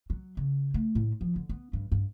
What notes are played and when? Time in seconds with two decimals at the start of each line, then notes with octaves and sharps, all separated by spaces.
0.10 F#3
0.37 C#3
0.74 A3
0.95 A2
1.21 F3
1.36 D3
1.49 B3
1.73 G2
1.92 G2